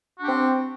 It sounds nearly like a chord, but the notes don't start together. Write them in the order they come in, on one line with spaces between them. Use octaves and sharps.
F#4 D4 G4 C4